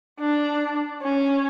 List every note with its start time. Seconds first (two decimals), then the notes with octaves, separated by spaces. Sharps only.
0.19 D4
1.02 C#4